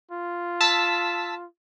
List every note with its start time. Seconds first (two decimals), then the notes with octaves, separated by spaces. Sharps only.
0.11 F4
0.61 A5 E6 B6